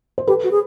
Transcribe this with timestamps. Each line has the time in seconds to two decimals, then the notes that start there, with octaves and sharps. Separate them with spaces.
0.18 C5
0.27 G4 A4 B4
0.44 F#4
0.51 G#4